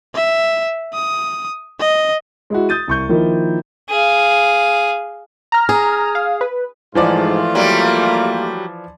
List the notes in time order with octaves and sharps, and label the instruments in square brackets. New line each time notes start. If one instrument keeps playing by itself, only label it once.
[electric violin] E5
D#6
D#5
[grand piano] G#3 E4 F#4
D#6 G6 A6 D#7
C2 C#6 G6
D#3 F3 A#3 E4
[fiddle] G#4 F5
[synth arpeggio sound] A#5 F6
[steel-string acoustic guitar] G#4
[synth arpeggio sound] F5
B4
[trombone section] G#2 [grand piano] E3 F3 D5 [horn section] A3 F4
[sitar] F#3 G3 [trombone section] A#3